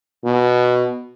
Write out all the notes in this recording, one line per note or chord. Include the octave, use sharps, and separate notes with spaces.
B2